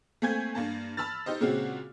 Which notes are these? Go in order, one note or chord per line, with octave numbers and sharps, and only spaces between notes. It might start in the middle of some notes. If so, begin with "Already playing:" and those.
A3 A#3 C4 G#5 G6 G#6
G2 A#3 A5
A5 B5 E6 F6 A6
D#4 G4 C5 D#5
A#2 C#3 G#3 C4 C#4 F#4